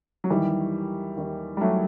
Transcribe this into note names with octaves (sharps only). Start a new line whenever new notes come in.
F#3
D#2 D#3 E3 G3
D#2 D#3
G3
F#3 A3